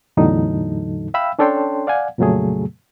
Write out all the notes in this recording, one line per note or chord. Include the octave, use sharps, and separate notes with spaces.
E2 A2 D3 F#3 D#4 A4
E5 F5 G5 B5 E6
C#4 D4 A4 C#5 G5 C6
D5 F5 F#5 G#5
F2 A#2 C#3 F#3 A3 G#4